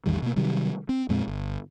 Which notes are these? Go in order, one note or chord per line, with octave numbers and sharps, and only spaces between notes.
A1 E2 D#3 G3
B2 A#3
C3 D#3 F#3 G3
C4
F2 A#2 G#3 C4
G1